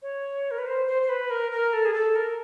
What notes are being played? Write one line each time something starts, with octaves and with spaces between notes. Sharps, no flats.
C#5
A#4
B4
C5
C5
C5
B4
A#4
A#4
A4
G#4
A4
A#4